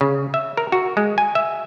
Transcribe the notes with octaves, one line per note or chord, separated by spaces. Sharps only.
C#3
E5
A#4
F#4
G#3
G#5
E5